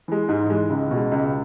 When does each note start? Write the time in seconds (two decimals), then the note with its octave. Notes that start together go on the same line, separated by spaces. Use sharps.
0.08 E3 G#3
0.29 G#2
0.50 E3 G#3
0.70 C#2
0.91 B2 G#3
1.12 C#2